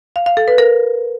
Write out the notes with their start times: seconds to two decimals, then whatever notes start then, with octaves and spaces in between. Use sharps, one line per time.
0.16 F5
0.26 F5
0.37 A4
0.48 B4
0.58 A#4